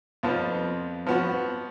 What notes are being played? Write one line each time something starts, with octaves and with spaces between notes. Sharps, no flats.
F2 F3 B3
F3 B3 F#4